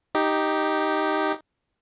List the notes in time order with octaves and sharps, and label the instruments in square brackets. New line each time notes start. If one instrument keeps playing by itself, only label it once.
[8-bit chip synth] D#4 G4